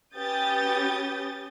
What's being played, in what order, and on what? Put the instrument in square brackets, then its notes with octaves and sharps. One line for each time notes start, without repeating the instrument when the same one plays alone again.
[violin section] C#4 G4 B4 D#6 G6 A6